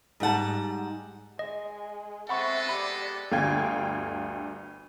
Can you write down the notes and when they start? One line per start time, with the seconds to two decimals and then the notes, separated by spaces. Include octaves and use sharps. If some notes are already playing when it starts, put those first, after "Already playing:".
0.20 G#2 G3 F#5 A5
1.39 G#3 D#5
2.29 G#3 B3 C4 A4 E5 F#5 B5 C#6
2.69 G4 D5 B5
3.32 G1 D2 D3 F5 G5 G#6